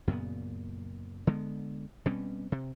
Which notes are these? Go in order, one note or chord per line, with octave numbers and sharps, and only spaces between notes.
F#2 A#2 C#3 B3
D3 G#3 B3
B2 G3 C4 C#4
C3